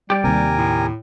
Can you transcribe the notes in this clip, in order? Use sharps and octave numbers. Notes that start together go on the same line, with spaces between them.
G3 G4 D5
D#2 C3 A#4 G#5
A2